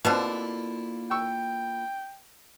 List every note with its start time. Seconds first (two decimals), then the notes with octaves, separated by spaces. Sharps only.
0.05 B2 D3 A#3 C4 D4 E4 F4 F#6
1.11 G5 C#6 E6